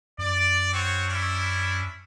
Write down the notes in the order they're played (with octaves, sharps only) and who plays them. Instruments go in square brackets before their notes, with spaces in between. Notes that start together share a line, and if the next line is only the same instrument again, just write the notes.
[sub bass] F#2 [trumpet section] D5
[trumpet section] C4 F#4 C#5
C#4 D4 E4